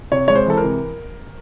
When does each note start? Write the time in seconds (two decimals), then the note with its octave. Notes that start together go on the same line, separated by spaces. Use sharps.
0.12 C3 C#5
0.28 G#3 C#5
0.35 C5
0.46 E3 A4
0.57 A#4
0.64 C3